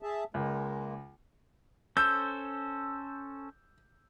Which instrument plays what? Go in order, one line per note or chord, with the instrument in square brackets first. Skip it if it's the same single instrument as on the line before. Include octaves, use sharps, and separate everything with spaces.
[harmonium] G#4 E5 A5
[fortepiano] C#2 [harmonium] G#3 A#3
[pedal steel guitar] C#4 A4 C5 [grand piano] E6 G6